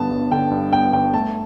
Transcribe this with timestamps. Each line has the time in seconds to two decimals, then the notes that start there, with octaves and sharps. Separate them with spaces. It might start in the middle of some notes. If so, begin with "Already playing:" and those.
Already playing: G2 D3 B3 A5
0.10 G1
0.31 D3 G5
0.51 G2
0.72 B3 G5
0.93 G1 G5
1.13 A3 A5